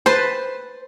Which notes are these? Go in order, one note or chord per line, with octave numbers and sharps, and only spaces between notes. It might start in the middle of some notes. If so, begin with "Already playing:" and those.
B4 C5 A5